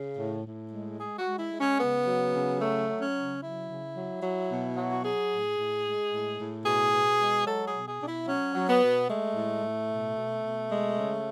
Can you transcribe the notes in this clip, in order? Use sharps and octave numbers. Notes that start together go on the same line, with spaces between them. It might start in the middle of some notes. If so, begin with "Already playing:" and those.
Already playing: C#3
A2
A2
G#3
G#3 G#4
F#4
G#3
E4
G#3
C#4
C#3 B3
F#3
C#3
F#3 A3
F#3
C#4
C#3
F#3 E4
C#3
F#3
F#3
B2
F#3
F#4
F#3 G#4
A2
A2
G#3
A2
A2
B2 G#4
B2
G#3
F#3 A4
G#4
B2
G#4
B2 D4
E4
F#3 C#4
F#3
B3
B2
G#3 A3
A2
A2
B2
B2
B2
G#3
C#3